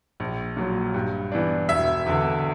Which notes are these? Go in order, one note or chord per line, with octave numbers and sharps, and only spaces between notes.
A#1
A#2 F#3
G2
E3 B3 D4
E1 E5
E2 D3